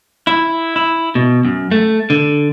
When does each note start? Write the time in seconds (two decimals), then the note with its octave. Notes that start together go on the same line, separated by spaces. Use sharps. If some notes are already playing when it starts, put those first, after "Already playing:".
0.27 E4
0.76 E4
1.15 B2
1.45 F#2
1.71 A3
2.10 D3